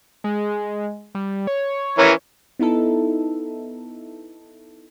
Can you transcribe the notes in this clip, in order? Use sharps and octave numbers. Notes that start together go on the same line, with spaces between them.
G#3
G3
C#5
E3 C#4 A#4
B3 D#4 E4 A4